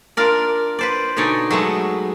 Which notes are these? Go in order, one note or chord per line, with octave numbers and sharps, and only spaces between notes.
D4 F4 A#4 D5
B4 C5 D5
B2 D3 D#4 C#5 D5 G#5
F#3 G#3 A3 B3